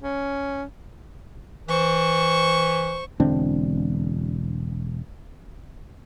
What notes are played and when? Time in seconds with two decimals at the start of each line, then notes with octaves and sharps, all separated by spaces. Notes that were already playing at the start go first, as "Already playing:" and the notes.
0.02 C#4
1.68 E3 C5 C#6
3.20 E1 D3 C4 D4